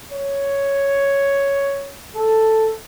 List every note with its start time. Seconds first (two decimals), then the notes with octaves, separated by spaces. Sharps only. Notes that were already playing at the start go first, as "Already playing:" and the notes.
0.12 C#5
2.16 A4